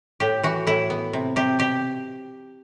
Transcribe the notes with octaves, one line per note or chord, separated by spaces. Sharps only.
A2 G4
E3 F#4
A2 E4
B3
C3
C3 G4
B2 G4